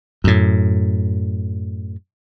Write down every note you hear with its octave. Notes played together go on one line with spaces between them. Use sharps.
F#2 A2